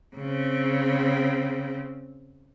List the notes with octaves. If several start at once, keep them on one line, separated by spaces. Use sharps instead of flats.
C#3 C4